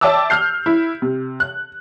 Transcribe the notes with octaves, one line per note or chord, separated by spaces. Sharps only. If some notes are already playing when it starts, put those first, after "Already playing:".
D5 E5 G5 A5 D6 E6
F6 G6 C7
E4
C3
F#6